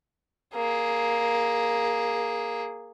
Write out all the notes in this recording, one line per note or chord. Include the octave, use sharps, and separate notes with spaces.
A#3 G#4